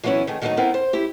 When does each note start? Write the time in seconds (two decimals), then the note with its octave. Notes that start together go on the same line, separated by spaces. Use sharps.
0.04 E3 F#3 A#3 B3 C#4 E4
0.27 D#3 A3 G#4
0.42 D#3 F#3 G3 A3 B3 D#4
0.57 B3 C4 E4 A#4 B4
0.74 C5
0.93 E4 G4